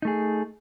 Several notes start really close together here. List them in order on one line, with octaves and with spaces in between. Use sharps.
D#4 A3 G#4